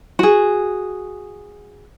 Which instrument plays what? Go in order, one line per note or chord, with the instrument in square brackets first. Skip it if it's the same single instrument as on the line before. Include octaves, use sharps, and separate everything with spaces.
[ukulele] F#4 G#4